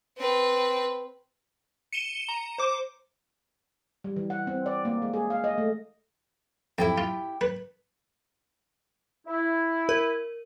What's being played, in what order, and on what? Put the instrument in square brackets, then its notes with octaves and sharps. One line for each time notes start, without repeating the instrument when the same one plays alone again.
[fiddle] C4 B4
[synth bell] C#7 D#7 E7 G7
A#5
C5 D6
[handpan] G3
E3
F#5
C4
D5
A#3
G#3
G#4
F5
D#5
A3
[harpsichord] F2 [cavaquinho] E4 G4 G5
[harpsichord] F4
B4
[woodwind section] E4
[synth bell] A#4